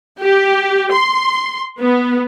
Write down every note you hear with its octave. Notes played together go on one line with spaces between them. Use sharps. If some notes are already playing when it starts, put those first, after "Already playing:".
G4
C6
B3